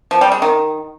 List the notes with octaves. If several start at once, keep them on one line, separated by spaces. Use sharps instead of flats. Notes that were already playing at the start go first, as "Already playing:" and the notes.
F3
G3
G#3
D#3